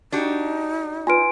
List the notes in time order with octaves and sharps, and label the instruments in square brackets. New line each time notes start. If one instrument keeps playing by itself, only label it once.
[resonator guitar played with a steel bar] D4 F#4 G4 [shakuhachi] D#4
[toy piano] F4 B4 [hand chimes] G#5 C6 D7